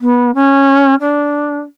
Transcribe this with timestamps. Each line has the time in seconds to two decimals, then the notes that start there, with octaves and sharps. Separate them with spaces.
0.01 B3
0.34 C#4
1.00 D4